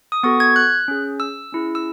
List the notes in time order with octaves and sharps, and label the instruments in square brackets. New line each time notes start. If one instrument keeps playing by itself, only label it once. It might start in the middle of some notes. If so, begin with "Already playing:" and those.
[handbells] D#6
B3 F#4 A4 C#6
G#6
F#6
C#4 G#4
E6
C#4 E4 G#4
E6